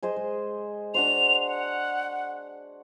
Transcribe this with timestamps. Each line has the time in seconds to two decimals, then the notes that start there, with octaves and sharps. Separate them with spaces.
0.03 G#4 C5 D#5
0.16 G#3
0.94 D4 F#4 C5 F7
1.46 F#5